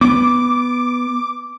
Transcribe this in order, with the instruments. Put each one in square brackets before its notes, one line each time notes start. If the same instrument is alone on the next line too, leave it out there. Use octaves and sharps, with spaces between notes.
[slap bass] B3 [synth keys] D6